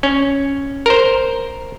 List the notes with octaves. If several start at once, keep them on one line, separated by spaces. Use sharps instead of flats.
C#4
A#4 C5